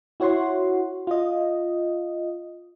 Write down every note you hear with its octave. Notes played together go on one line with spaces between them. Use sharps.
E4 F#4 C#5 F#5 C6
F4 D#5